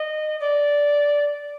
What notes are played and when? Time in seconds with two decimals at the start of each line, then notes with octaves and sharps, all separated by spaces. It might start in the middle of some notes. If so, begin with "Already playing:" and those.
Already playing: D#5
0.40 D5